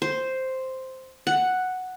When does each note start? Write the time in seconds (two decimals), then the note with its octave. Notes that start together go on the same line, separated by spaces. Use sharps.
0.02 C5
1.27 F#5